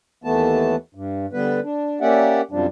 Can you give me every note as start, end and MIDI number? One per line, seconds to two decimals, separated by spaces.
0.24 0.76 39
0.24 0.76 52
0.24 0.76 57
0.24 0.76 59
0.24 0.76 81
0.95 1.26 43
1.33 1.60 50
1.33 1.60 55
1.33 1.60 59
1.33 1.60 71
1.63 1.99 62
2.01 2.41 58
2.01 2.41 61
2.01 2.41 67
2.01 2.41 74
2.01 2.41 76
2.01 2.41 78
2.51 2.67 42
2.51 2.67 48
2.51 2.67 53
2.51 2.67 55
2.51 2.67 62